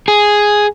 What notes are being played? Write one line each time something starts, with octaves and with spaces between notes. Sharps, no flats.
G#4